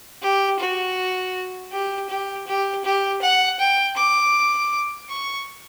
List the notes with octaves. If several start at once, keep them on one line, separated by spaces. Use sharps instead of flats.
G4
F#4
G4
G4
G4
G4
F#5
G5
D6
C#6